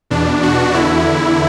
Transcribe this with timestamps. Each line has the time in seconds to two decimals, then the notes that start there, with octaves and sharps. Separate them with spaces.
0.10 E2 B2 D4
0.43 F#4
0.74 E2 D3 E4